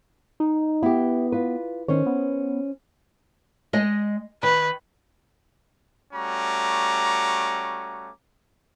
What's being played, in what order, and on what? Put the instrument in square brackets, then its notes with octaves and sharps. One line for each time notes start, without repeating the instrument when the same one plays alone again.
[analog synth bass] D#4
[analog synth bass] B3 [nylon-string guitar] E4 G4
[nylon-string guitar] F4 B4
[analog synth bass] D#3 [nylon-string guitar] C#4 C5 C#5
[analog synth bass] B3
[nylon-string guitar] G#3 D#5
[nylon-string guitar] D#3 [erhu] B4
[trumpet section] G3 A3 C#4 F#4 A#5 D6